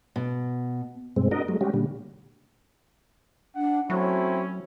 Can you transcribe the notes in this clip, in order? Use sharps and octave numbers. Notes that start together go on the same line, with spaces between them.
B2
G2 B2 G#3 C4
D4 F#4 A#4 D#5
F#3 G#3 A3
G3 G#3 C#4 F#4 G4
A#2 D3 G3
D4 F#5
F#3 A3 C4 C#4 E4 F#4